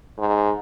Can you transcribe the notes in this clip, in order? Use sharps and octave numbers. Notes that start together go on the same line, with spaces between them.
G#2